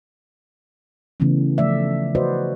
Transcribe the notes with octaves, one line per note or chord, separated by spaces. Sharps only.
C#3 E3 A3 B3 C#4
F3 A3 D5 E5
F#4 B4 C5 D5 D#5